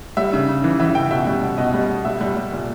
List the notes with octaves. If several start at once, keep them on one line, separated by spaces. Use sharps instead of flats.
G3 E5
C#3
C#3
E3
E3 E5
C#3 G5
B2 E5
G3
B2
B2 D#5
G3
B2
G3 E5
G3
G3
A#2